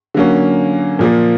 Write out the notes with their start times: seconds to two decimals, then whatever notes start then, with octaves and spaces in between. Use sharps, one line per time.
0.14 D3 F#3 A#3 C#4
0.99 A#2 F3 A#3